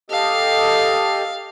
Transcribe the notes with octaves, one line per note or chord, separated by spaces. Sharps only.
G4 A4 D#5 F5